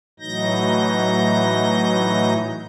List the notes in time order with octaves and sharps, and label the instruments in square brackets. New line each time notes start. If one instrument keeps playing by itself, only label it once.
[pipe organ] A2 E3 F#3 D#4 G6 A#6